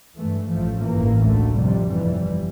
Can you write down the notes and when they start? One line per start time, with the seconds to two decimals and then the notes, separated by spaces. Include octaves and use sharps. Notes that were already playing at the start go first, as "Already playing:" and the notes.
0.17 G2 E3 A3
0.52 A1 A2 F3 A3
0.87 A1 G2 E3 A#3
1.22 D2 D3 A3
1.56 F2 C3 G3
1.91 G1 F2 E3 G3